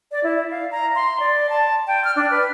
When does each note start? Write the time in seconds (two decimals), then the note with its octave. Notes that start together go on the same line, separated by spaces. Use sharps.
0.12 D5
0.24 E4
0.51 F5
0.71 A#5
0.95 C6
1.20 D5
1.50 A5
1.87 G5
2.04 F6
2.16 D4
2.31 B4